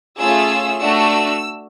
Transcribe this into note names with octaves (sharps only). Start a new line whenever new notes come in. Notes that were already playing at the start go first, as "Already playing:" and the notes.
A3 C#4 F4 G#4 E6
A3 D4 F#4 E6